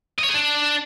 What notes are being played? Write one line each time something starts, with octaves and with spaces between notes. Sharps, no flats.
D#5
C#5
G#4
D4